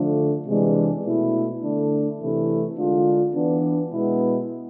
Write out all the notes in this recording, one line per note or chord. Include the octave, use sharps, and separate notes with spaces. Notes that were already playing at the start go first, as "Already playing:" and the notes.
Already playing: D3 F3 A3 D4
C3 E3 G#3 D4
B2 A3 E4
D3 A3 D4
C3 E3 A3 E4
D3 G#3 D4 F4
E3 B3 D4
B2 G#3 B3 E4